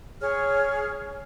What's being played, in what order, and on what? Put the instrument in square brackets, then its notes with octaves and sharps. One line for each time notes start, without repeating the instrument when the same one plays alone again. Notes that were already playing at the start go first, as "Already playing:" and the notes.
[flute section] G#4 C#5 F6